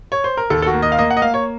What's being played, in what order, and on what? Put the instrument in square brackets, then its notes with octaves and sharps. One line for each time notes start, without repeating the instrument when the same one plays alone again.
[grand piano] C#5
C5
A#4
D#2 A4
A4
F#4
A#3
D#5
F5
A#3 D#5
F#5
D#5
A#3 F5
C#5